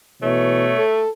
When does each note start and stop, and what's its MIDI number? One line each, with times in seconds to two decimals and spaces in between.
0.22 0.78 47
0.22 0.67 52
0.22 1.03 57
0.22 0.83 73
0.78 1.09 69